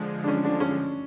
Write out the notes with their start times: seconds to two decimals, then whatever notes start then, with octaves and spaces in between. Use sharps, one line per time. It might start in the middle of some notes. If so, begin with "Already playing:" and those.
Already playing: D3 F3 G#3
0.24 D4
0.28 C#4
0.44 D4
0.60 C#4